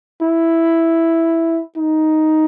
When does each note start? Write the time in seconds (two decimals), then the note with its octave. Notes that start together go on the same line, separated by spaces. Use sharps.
0.22 E4
1.77 D#4